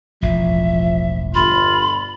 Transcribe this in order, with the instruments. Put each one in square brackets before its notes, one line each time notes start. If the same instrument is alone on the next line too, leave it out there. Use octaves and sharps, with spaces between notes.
[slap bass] E1 A1 [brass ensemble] F3 [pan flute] E5
[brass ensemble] G1 [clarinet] F4 [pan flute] B5